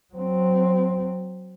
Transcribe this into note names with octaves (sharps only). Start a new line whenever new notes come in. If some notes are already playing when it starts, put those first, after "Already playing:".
F#3 C4